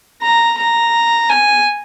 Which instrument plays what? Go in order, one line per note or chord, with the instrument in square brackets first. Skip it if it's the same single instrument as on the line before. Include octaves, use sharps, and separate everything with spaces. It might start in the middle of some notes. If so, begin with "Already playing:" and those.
[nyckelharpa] A#5
A#5
G#5